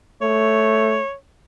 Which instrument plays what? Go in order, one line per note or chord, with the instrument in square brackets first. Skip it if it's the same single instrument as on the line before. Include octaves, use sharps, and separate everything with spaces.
[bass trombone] A3 [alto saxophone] C#5